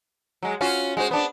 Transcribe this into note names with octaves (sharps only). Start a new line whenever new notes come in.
F#3 G#3
C#4 F4 F#4
G#3 F#4 C5
B3 D4